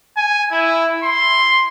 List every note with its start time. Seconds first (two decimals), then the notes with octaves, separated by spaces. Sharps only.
0.17 G#5
0.52 E4
1.04 C6